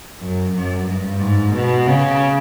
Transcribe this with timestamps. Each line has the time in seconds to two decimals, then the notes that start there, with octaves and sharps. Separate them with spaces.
0.20 F#2
0.54 F#2
0.87 G2
1.20 G#2
1.55 B2
1.87 C#3